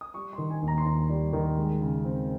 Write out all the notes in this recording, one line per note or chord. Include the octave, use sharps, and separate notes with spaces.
D#6
G3 C#6
C6
D#3
G#5
D#2
A#5
C6
D#2 A#5
G3
D#3
G#3
C#3
C4